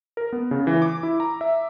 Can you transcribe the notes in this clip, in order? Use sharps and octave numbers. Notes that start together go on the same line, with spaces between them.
A#4
B3
C#3
E3
D6
E4
A#5
E5